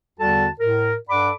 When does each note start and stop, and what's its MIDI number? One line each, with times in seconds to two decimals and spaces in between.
0.19 0.47 40
0.19 0.47 50
0.19 0.47 55
0.19 0.47 66
0.19 0.47 69
0.19 0.47 81
0.59 0.94 45
0.59 0.94 70
1.09 1.30 43
1.09 1.30 69
1.09 1.30 74
1.09 1.30 78
1.09 1.30 83
1.09 1.30 86